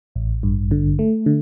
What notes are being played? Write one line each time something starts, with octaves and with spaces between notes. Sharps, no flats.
A1
G2
D3
A3
D3